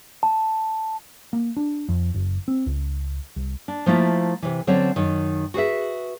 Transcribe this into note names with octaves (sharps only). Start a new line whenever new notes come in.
A5
A#3
D4
F2
F#1
C4
C#2
C2
D4
F3 A3 A#3 E4 F4
C3 E3
D3 F#3 C4 C#4 A4 C#5
F#2 D#3
F#4 G#4 B4 E5